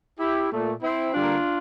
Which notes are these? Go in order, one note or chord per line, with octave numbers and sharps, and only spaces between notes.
E4 G4
A#2 A3
C4 E4
D3 G3 A#3 D4 F4